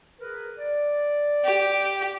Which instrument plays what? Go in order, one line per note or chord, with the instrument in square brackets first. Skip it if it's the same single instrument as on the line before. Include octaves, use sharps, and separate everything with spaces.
[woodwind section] G#4 A#4 B4
D5
[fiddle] G4